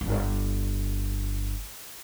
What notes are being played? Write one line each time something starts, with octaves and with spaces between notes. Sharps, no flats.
D1 G1